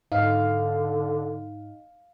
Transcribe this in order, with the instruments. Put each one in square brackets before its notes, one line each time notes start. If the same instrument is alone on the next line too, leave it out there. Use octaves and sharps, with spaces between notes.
[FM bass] G#2 [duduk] D3 [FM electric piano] D#4 [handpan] F5